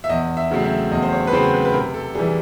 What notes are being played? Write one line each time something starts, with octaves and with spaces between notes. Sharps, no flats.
E5
E2 D#5
E5
C#3 F#3 A3 C4
E5
E2 D#5
C5
C#5
B4
C#3 F#3 A3 C4 C5
B4
B4
C3 A#4
A4
E3 G3 G#4